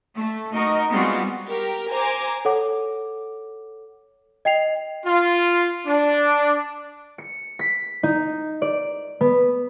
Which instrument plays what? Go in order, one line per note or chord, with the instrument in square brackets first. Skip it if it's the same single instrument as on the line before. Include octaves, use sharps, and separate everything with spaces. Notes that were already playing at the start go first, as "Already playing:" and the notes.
[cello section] A3
D#4 F#4 A#4 D#5
G3 G#3 B3 C4 F4 F#4
[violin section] G4 A#4
C5 G#5 A#5 D6
[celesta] A4 C#5 F#5 D6
D#5 G5 C7 F7
[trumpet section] F4
D4
[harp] C#7
B6
D#4
D5
B3